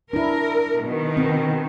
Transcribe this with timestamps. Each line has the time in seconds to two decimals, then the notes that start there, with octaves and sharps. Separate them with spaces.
0.13 D4 E4 A#4
0.84 B2 D#3
1.17 C4